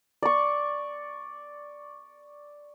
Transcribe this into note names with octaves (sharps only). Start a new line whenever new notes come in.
D5 C#6